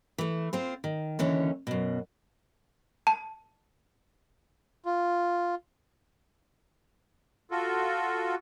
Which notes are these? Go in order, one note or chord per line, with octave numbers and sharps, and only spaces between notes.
E3 A3
C4 F4 C5
D#3
D#2 D3 E3 C#4
F#2 B2
A5
F4
F4 F#4 A4